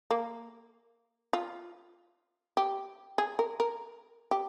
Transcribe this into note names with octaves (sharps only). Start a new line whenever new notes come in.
A#3
F4
G4
G#4
A#4
A#4
G4